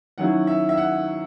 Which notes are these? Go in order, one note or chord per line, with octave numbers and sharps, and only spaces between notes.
D#3 F#3 C#4 E4 F#5
E5
E5
F#5